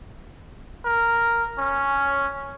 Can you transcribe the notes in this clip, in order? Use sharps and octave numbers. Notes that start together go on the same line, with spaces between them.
A#4
C#4